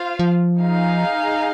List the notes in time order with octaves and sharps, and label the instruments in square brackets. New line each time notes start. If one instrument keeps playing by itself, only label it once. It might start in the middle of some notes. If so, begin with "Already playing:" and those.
Already playing: [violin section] F4 C5 F5
[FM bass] F3
[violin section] D#4 G#4 F5